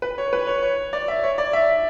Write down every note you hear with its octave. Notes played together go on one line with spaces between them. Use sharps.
B4
C#5
B4
C#5
C#5
D5
E5
C#5
D5
E5